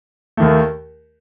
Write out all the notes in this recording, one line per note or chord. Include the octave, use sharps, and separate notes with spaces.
D#2 D#3 A3